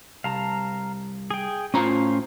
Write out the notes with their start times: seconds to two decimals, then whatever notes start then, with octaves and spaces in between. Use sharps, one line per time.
0.24 C2 F5 A5 A#5
1.31 G#4 G5
1.74 A2 C#4 F4 C5 F5 A#5